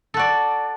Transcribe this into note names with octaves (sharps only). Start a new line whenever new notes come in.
F#4 A4 D5